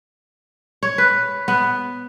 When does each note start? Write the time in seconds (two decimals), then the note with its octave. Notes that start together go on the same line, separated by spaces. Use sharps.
0.83 C#5
0.98 B4
1.48 B3